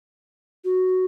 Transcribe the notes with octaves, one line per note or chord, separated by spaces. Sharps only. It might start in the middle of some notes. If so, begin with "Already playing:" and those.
F#4